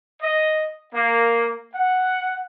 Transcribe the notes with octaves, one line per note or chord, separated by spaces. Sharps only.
D#5
A#3
F#5